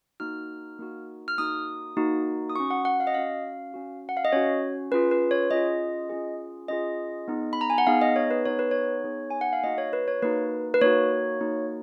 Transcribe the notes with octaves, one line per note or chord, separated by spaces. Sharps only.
A#3 D#4 F#4 F6
A#3 D#4 F#4
F6
A#3 D#4 F#4 D#6
A#3 D#4 F#4
D#6
C#4 F#4 C#6
F#5
F#5
F5
D#5
C#4 F#4 F5
C#4 F#4
F#5
F5
D#5
C#4 F#4 C#5
C#4 F4 G#4 B4
B4
C#5
C#4 F4 G#4 D#5
C#4 F4 G#4
C#4 F4 G#4 D#5
B3 D#4 G#4
B5
A#5
G#5
F#5
B3 D#4 G#4 F5
D#5
C#5
B4
B3 D#4 G#4 C#5
B4
C#5
B3 D#4 G#4
G#5
F#5
F5
A#3 D#4 F#4 D#5
C#5
B4
C#5
A#3 D#4 F#4 B4
B4
A#3 D#4 F#4 C#5
A#3 D#4 F#4